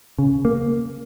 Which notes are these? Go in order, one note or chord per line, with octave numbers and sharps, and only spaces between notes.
C#3
A#3